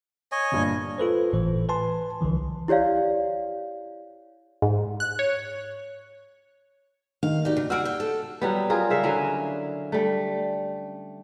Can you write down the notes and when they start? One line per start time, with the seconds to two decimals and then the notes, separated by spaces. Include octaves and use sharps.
0.32 C#5 D#5 G#5
0.52 G1 G2 A#2
0.98 F4 A4 B4 C5
1.33 G1 A2 E3 C5
1.69 B4 G#5 A5 C6
2.21 C2 D3 E3 F3
2.68 E4 G4 C#5 D5 F5
4.62 G#2
5.00 F#6
5.19 C#5
7.23 D#3 F5
7.45 D#4 F#4 G4 D5
7.57 C#3
7.70 F#4 G#4 E6 F6 D7
7.85 G4
8.00 A4
8.42 F#3 G3 B3
8.70 F4 G#4 A#4
8.90 C#3 E5 F5
9.03 D3 F#3 C#4 E4
9.92 G3 A3